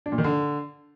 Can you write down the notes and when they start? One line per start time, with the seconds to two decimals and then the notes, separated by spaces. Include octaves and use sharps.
0.06 D4
0.12 A#2
0.18 D#3
0.24 D3